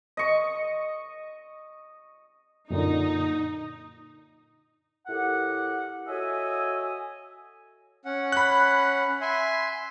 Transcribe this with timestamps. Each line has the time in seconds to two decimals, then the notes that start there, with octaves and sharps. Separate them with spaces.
0.17 D#5 C#6
2.71 F#2 A#2 D3 D#4
5.07 A2 G4 A#4 F#5
6.08 F#4 A4 C#5 D#5 E5 G#5
8.05 C#4 F#5
8.32 B5 F#6
9.21 E5 G#5 C6